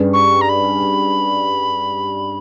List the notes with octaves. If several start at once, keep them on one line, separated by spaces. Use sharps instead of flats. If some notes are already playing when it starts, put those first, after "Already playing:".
Already playing: G2 G3 C#4 G#4 B4
C#6
A#5
B5